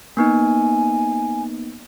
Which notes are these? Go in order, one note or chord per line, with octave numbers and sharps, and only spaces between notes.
A#3 B3 D#4 G#5